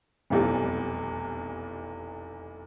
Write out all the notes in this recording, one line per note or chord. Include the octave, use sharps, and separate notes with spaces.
F1 B1 E2 G3